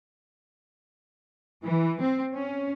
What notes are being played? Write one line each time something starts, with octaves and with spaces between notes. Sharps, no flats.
E3
C4
C#4